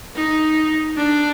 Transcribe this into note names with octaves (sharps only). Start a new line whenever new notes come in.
D#4
D4